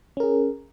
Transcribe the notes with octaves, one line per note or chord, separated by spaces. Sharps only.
C#4 G#4 A#4